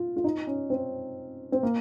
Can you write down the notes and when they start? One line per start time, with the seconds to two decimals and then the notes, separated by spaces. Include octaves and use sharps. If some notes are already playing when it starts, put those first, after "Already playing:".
Already playing: F4
0.17 F4
0.24 D#4
0.47 C#4
0.70 C4
1.52 C4
1.63 A#3